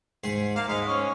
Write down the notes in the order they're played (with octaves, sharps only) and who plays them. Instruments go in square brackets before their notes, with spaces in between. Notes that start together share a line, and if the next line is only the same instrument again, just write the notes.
[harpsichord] G#2 G#4 C6
[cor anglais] A#3 [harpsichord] F5 A5
[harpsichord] G#2 F5 [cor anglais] G#3
[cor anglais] C#4